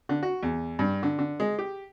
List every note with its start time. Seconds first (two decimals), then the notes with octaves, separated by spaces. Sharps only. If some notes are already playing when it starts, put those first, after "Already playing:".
0.09 D3
0.23 F#4
0.43 E2
0.79 G2
1.03 D3
1.19 D3
1.40 G#3
1.59 G4